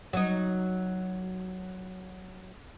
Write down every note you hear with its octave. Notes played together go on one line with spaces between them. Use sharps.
F#3 D#4